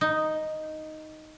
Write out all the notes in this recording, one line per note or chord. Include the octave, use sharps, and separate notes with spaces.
D#4